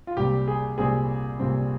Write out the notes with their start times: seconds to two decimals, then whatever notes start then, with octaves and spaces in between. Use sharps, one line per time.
0.07 F4
0.17 C2 A#2 G3 C4 G4
0.48 G#4
0.78 C2 A#2 G3 C4 G#4
1.39 C2 A#2 G3 C4